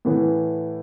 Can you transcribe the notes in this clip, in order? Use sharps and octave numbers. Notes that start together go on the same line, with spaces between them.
A2 E3 B3